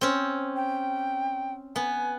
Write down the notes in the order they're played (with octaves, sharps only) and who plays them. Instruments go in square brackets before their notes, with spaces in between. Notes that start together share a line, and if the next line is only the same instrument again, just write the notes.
[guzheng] C4 C#4
[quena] G5
[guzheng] B3 [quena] G#5